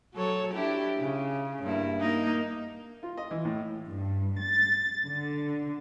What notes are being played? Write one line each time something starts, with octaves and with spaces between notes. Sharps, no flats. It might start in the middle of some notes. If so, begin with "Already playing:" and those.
F#3 A4 C#5
D4 E4 G4
C#3
G2 A#3 E4
A#3 D#4
F4
D#5
E3
A2
G2
A6
D3